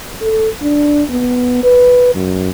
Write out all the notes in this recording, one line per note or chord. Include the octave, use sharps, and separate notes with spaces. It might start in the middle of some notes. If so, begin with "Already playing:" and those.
A4
D4
B3
B4
F#2